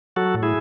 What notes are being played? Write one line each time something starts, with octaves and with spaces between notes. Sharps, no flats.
F#3 F#4 A4
A2
E4 G#4